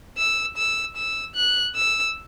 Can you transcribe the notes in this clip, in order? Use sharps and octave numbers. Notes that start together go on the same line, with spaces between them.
E6
E6
E6
F#6
E6